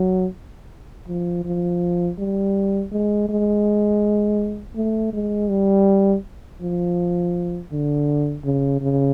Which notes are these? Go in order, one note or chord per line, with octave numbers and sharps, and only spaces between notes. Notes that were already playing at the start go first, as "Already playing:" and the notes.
Already playing: F#3
F3
F3
G3
G#3
G#3
A3
G#3
G3
F3
D3
C#3
C#3